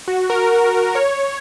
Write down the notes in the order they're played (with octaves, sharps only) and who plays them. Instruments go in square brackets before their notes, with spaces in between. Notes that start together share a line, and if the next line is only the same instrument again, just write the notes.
[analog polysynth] F#4
A#4
C#5